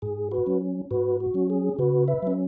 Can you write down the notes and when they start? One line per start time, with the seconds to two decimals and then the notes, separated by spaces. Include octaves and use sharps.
0.02 G#2 G#4
0.31 F#4 B4
0.46 F#3 C#4
0.91 G#2 F#4 B4
1.20 F#4
1.34 F#3 C#4
1.50 G#4
1.79 C#3 F#4 B4
2.08 B4 E5
2.23 F#3 C#4